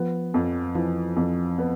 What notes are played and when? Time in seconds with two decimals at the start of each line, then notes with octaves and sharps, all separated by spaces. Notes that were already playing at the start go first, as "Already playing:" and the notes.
Already playing: F3 B3
0.34 F2
0.75 E3 F3
1.16 F2
1.58 B3